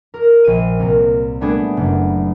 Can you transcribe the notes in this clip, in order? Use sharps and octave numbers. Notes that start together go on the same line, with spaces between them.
A#4
A#1 D#7
C2 A#4
G3 A3 B3 D4 G#4
F#1